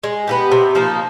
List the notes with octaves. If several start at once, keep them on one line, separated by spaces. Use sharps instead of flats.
G#3
B3 E4 G4
C3
F3 A#3 D#4